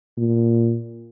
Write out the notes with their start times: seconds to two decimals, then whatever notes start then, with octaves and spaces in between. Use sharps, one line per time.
0.18 A#2